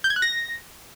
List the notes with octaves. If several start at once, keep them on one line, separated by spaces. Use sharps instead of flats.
G6
G#6
F#6
A#6